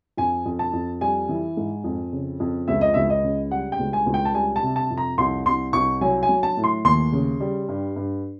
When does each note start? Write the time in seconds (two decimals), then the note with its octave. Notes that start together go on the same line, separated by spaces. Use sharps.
0.17 F2 G#5
0.46 F2
0.59 A5
0.73 F2
1.01 G3 G#5
1.29 E3
1.57 G#2
1.84 F2
2.13 C#3
2.40 F2
2.68 C#2 E5
2.81 D#5
2.94 C#2 E5
3.10 D#5
3.24 C#3
3.51 G3 F#5
3.72 G5
3.79 C#2
3.93 G#5
4.06 C#2
4.14 G5
4.25 A5
4.34 G3 G#5
4.56 A5
4.63 C3
4.76 A5
4.91 F2
4.98 A#5
5.18 C2 C6
5.46 C2 C6
5.73 C2 C#6
6.01 F#3 G#5
6.23 G#5
6.29 F#3
6.43 A5
6.57 A2
6.64 C6
6.84 D#2 C6
7.13 C#3
7.40 G3
7.69 G2
7.96 G2